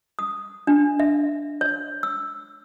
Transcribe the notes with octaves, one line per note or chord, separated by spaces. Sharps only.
D#6
D4
E5
C#5
E6